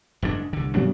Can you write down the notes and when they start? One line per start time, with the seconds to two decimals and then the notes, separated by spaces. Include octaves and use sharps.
0.22 F#1 G#2 B2 D4
0.53 C2 D3
0.75 C3 F#3 B3 D4